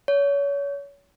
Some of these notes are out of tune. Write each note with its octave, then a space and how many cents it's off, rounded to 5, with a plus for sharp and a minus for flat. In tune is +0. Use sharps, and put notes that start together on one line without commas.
C#5 +30